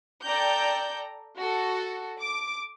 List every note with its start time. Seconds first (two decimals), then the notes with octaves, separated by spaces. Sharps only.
0.24 A4 D5 G5 A#5 G6
1.37 F#4 A4
2.19 D6